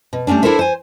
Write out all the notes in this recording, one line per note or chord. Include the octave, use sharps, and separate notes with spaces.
B2
G3 A3 A#3 C#4 D4
D4 E4 A4 A#4 C5 E5
C5 G#5